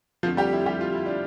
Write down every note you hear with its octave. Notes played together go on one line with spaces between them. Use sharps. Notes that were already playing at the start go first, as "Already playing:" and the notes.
F2 D3 F3 A3 F4
G3 G4
E4
G3 G4
F4
E4
D4